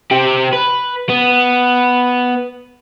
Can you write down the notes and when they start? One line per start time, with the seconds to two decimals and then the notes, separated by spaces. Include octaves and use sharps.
0.11 C4 G4
0.53 B4
1.09 B3